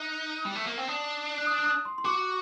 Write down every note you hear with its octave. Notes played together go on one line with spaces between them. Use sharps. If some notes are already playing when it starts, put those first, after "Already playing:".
Already playing: D#4 F#6
G3
A3
A#3
C4
D4 D#6
F#6
D#6
F#6
D#6
C6
C6
F#4 D6